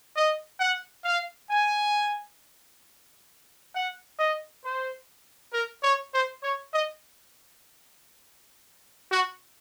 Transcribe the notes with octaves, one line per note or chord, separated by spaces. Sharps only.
D#5
F#5
F5
G#5
F#5
D#5
C5
A#4
C#5
C5
C#5
D#5
F#4